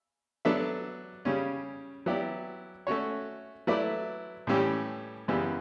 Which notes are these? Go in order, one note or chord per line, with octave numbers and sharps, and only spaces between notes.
F#3 B3 D4 A4 E5
C#3 G3 C#4
F#3 B3 E4 G4 D5
A3 C#4 F#4 C#5
F#3 A3 E4 B4 D5
A2 E3 G3 C#4 G4
F#2 C#3 E3 G3 B3